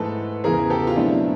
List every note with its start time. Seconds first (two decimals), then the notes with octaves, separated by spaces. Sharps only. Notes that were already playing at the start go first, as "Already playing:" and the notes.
Already playing: G#2 E3 A3 A4 B4
0.44 E2 C#3 E3 G#4 A#4
0.70 G4 A4
0.87 F4
0.96 B2 F#3 A3 C4 D4 E4